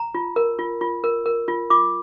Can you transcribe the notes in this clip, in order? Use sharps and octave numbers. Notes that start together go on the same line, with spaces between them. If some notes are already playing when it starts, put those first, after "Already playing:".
Already playing: A#5
F4
A#4
F4
F4
A#4
A#4
F4
F4 D6